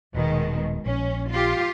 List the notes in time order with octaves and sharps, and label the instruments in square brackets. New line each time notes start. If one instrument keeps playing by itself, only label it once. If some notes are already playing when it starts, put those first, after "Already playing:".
[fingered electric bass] D#1 [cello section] B2 D#3 G#3
[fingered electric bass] A#1 [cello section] C#4
[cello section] F4 G4